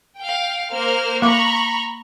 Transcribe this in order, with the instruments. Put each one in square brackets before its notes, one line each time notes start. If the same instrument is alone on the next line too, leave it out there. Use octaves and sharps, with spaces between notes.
[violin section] F5 G5
A#3 C5 F6
[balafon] A#3 D6 [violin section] A#5 B5 C#6